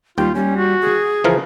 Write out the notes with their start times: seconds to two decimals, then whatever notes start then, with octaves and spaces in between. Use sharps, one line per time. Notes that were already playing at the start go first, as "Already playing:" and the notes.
0.18 D#2 G3 F4 G5
0.35 G3 C#4
0.57 F#4
0.81 G#4
1.24 C#3 E3 F3 A#4